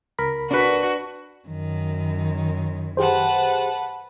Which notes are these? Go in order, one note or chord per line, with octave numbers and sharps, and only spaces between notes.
C#2 A#4 B5
D4 F#4 B4
F#2 D#3
G4 G#4 B4 C5 F#5 A5